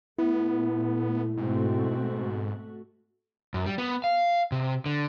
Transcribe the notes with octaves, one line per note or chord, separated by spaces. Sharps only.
A#2 A3 B3 E4
G#2 B2 A3 C4 F#4
G#2
F#2
G3
B3
F5
C3
D3